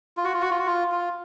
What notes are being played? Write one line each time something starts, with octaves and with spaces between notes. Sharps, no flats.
F4
F#4
F4
F#4
F4
F#4
F4
F4